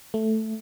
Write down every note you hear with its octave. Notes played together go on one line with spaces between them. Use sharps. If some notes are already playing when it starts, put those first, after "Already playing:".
A3